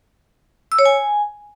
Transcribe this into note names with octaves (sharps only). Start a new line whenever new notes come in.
E6
C#5
G#5